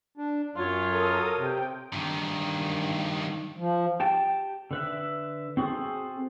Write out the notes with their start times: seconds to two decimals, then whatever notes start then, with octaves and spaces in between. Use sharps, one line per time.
0.17 D4
0.56 F#2 F#3 F4 C#5
0.88 A4 A#4 D#6
1.38 C3 G5
1.93 G2 D#3
3.57 F3
4.00 G4 G5 A5
4.71 D3 B4 E5
5.57 C4 F#4 G#4 A4 C5